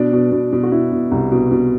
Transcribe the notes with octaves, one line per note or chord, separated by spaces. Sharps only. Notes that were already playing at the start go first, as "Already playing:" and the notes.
Already playing: B2 D4
B2
B2
B2
F#4
B2 E4
B2
C2
B2
B2